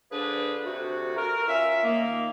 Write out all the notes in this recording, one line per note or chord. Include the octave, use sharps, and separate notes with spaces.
D3 F3 D4 G#4 B4
D2 C3 F#4
A#4
C#4 F4 E5
D#3 A#3